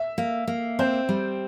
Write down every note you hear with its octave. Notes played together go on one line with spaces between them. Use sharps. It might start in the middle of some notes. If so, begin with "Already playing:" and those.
Already playing: E5
A#3
A#3
C4 C5
G3